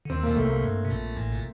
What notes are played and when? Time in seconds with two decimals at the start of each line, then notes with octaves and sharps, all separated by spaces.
0.05 D3
0.10 D#2 D#3 C4
0.23 A#2 A#3
0.36 C2 C3 A3
0.49 A#3
0.63 G2
0.85 C3
0.90 A#1 A#2
1.16 A1 A2
1.32 A#2